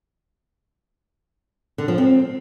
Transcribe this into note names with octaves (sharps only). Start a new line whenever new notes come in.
D3
F3
C4